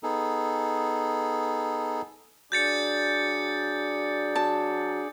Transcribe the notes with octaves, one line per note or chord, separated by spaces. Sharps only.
B3 D#4 G#4 A4
F#3 D4 G#4 D5 G6 A6 C#7
F#3 A5